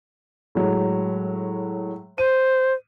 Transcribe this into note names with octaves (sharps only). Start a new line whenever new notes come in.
A2 F#3 G#3
C5 D#7